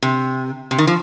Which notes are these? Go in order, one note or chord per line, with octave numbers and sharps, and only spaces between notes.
C3
C3
D#3
F3